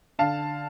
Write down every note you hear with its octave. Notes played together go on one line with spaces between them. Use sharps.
D3 F5 A5